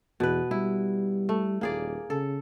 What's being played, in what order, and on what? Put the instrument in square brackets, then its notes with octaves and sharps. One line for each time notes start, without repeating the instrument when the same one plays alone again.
[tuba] E2 [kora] B2 B4
[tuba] G3 [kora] E4
[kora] A3
[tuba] D#1 [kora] A#3 G#4 D5
[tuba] C#3 [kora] A4